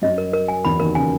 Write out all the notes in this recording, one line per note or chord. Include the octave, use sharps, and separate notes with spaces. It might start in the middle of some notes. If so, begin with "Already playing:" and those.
F#2 F#3 D#5
A#4
A#4
G#5
E2 E3 B5
D#2 D#3 A#4
C#3 G#5